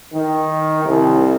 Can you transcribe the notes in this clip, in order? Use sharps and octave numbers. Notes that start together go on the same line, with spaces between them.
D#3
C2